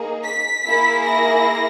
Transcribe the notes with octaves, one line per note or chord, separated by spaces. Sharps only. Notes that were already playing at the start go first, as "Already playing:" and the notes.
Already playing: A#3 D#4 G#4
B6
A#3 E4 G#4
A#6